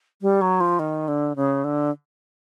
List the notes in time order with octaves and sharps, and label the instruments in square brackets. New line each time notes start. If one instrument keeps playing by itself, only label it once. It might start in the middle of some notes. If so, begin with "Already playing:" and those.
[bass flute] G3
F#3
F3
D#3
D3
C#3
D3